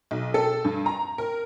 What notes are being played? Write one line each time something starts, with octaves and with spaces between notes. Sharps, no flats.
B1
A4
G2
A#5
A#4